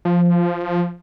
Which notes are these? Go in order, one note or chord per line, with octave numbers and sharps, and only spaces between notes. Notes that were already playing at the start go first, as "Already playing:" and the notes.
F3